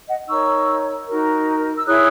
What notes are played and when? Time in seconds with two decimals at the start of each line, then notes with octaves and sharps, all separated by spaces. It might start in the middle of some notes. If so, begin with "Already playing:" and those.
0.08 D#5 F#5
0.28 D#4 A#4 C#5 C#6 E6
1.07 D#4 F#4 A#4
1.77 E6
1.86 E4 G#4 C#5 D#6 F#6